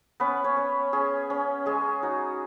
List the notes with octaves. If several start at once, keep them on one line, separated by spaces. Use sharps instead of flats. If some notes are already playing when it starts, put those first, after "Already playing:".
B3 C#4 B4
C#4 C#5
C#4
C#4 G#4
C#4
G#3 G#4
D#4 F#4